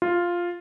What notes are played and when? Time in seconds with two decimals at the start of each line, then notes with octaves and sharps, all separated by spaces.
0.02 F4